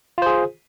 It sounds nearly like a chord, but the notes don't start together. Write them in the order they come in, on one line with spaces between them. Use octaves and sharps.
F4 C5 G#4